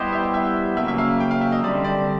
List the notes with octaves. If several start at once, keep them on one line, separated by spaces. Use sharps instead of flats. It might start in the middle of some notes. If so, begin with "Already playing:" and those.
Already playing: G3 B3 E4 G4 C5 D#5
E5
E5
C#3 F#3 A#3 E5
E5
F5
G5
F5
E5
D#5
D3 G3 C4 D5
D5